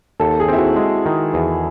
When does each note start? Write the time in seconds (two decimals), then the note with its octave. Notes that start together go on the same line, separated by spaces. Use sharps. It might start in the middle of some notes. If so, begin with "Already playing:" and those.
0.20 D#2 A4
0.40 G#4
0.48 C4 E4
0.57 F#4
0.76 G#3
1.06 D#3
1.34 E2